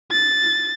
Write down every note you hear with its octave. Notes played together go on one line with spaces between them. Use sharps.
A6